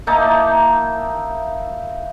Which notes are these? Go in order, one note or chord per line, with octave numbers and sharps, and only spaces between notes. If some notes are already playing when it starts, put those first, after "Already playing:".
A#3 D#4 E4 A5